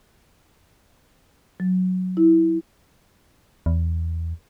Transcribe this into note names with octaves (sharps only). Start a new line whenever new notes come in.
F#3
E4
E2